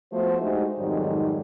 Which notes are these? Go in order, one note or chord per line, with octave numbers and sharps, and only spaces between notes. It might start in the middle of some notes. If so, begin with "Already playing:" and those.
F3 A3 B3 F#4 C5
G#3 A3 D4 D#4 F#4 G4
F2 G#2 D#3 F#3 G3 D#4